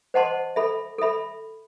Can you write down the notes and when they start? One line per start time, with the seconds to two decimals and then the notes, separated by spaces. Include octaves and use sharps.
0.14 C5 D#5 F#5 A5 C6
0.56 A4 E5 B5
0.98 A4 E5 B5